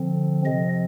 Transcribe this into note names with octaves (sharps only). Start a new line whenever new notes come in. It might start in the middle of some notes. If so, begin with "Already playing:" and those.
Already playing: D3 F3 C4
C3 F3 C4 D#5